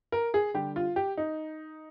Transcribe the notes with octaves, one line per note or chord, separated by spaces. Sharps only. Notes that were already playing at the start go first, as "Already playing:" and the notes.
A#4
G#4
D3 G3 G4
F4
G4
D#4